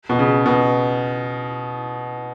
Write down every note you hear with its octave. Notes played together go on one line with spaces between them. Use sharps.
B2
C#3
B2